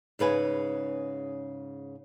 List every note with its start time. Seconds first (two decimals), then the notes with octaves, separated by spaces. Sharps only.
0.19 G#2 C#3 B4 G#5